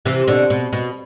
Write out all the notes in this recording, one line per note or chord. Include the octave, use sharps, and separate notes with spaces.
C3 E3
B2 D3
B2
B2